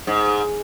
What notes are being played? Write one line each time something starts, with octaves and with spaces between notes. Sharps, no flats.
G#2